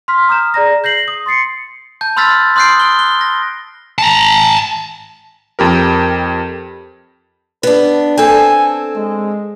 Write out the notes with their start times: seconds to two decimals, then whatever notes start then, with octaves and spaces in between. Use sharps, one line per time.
0.08 C6 F6 B6
0.28 A#5 D#6 F6 G6 E7
0.54 G#4 D5 A#5 A#6
0.84 G6 A#6 C7 F#7
1.08 D#6
1.26 C6 A6 C7 C#7
2.01 A5 G6
2.16 B5 C6 E6 F6 A6 B6
2.56 C6 D#6 F#6 G6 C7 D7
2.80 F#6 G7
2.99 G7
3.21 A#6
3.98 A5 A#5
5.59 F2 G4 A#4
7.63 B3 D4 B4
8.17 C4 A4 G#5
8.95 G#3